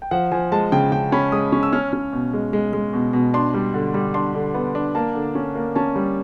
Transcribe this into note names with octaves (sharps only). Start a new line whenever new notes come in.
G5
F3 F#5
F3 G#5
G#3 A5
C#3 G5
C#3 G5
C#4 B5
G#3 D#6
C#4
E6
C#4 F6
C#4
B2
G#3
G#3
G#3
B2
B2
D4 C6
G3
D3
G3
D4 C6
D3
B3
D4
A#3 A5
D3
C#4
A#3
C#4 A5
G3